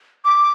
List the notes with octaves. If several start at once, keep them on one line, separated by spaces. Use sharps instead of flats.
D6